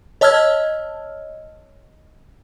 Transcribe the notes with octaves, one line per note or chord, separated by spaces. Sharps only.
C#5 D#5 A5 E6 F6 G#6